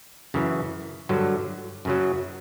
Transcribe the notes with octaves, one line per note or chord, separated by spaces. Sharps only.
F#2 C#3 E3
G2 D3 F#3
F#2 C#3 F#3